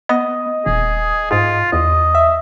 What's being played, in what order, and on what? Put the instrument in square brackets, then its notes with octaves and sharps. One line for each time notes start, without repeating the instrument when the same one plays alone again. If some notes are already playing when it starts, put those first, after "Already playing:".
[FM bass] B3 [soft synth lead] D#5
[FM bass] D#1 [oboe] G#4
[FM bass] G#2 [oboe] F4
[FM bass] E2 [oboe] D#5
[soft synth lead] E5